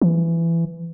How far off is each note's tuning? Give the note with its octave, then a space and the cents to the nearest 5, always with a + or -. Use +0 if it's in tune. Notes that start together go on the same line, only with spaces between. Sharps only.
E3 +20